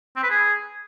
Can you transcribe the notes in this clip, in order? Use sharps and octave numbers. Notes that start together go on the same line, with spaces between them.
C4
B4
G#4